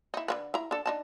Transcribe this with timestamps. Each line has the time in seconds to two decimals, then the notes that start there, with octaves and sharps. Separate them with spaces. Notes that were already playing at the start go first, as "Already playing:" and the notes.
0.14 D#4 E4
0.28 D3 A#3 B4
0.54 E4 A#5
0.71 D4 A4
0.86 D4 D#4 A5